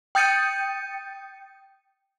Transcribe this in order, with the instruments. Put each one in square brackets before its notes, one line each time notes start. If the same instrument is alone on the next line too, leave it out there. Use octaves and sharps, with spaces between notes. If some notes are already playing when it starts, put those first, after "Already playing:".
[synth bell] G5 D#6 G6 A6 C#7 D#7